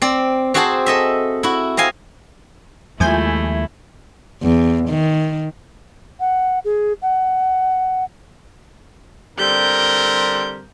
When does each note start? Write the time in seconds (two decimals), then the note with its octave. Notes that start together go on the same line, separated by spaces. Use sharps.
0.02 C4 D5
0.54 C4 F#4 G#4 C5 A5
0.86 A4 D#5 E5
1.43 E4 F#4
1.77 C4 D#5 F5 G#5
3.00 D#2 F3 G#3 A3 E4 G#5 G6
4.43 E2
4.89 D#3
6.19 F#5
6.64 G#4
7.02 F#5
9.39 D3 G3 C4 A#4 G6